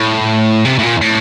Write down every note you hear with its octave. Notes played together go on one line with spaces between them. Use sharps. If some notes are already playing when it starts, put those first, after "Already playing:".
Already playing: A2
C3
A2
A#2
A2